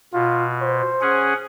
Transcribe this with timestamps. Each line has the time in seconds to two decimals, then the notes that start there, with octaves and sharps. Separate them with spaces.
0.13 B2 F4
0.61 C5
1.01 C#4 G#4 F#5